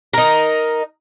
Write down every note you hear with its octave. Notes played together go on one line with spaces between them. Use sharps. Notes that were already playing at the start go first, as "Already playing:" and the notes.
D#4 A#4